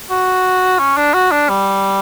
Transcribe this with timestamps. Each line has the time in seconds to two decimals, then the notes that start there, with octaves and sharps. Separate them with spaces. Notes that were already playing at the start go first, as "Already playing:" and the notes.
0.11 F#4
0.79 C#4
0.97 D4
1.14 F#4
1.32 D4
1.49 G3